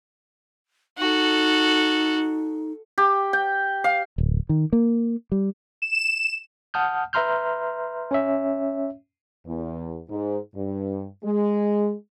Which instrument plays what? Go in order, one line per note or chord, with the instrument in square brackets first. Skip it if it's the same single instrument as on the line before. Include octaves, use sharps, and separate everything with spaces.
[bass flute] D#4 [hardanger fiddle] F#4 A4
[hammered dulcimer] G4
G5
F5
[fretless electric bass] D1
D#3
A#3
G3
[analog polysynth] E7
[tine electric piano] F#5 A5 D#6 F6 G6
B4 E5 A#5 C6 F6 G6
C#4 C#5 E5
[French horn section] E2
G#2
G2
G#3